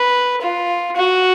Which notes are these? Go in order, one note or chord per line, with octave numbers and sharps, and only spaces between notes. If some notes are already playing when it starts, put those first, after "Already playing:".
Already playing: B4
F4
F#4